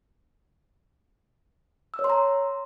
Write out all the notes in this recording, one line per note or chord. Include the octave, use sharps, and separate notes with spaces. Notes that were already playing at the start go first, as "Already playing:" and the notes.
E6
C#5
C6
A#5